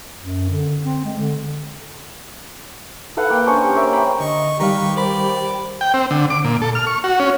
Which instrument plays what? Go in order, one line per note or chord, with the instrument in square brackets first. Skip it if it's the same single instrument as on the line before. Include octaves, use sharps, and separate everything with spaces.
[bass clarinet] F#2
D3
C4
G#3
D3
[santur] A4 B4 F5 F#5
A#3 F5 G5
C#4 D4 C5 C#6
G4
A#4 C#5 E5
G5 B5 C6 D6
[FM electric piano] D3 [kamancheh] D#5 [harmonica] C#6
[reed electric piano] D#3 G3 F5 [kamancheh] G4 [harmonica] B4 C#6 [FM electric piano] A#5
[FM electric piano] A#4 C5 B5 [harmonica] D5
[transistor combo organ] G5
C4
D3
D6
A#2
A4
F6
C#6
F#4
C#4